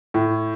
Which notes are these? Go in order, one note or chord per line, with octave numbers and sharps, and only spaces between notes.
A2